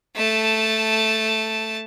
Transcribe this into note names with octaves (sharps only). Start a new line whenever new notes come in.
A3 A5